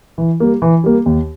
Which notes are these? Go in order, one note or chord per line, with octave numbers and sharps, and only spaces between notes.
E3
G3 A#3
E3
G3 A#3
D#2